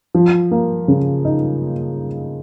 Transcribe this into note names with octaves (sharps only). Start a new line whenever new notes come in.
F3
A#3
C#3
D#4